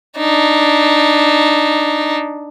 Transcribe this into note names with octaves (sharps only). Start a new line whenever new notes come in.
D4 D#4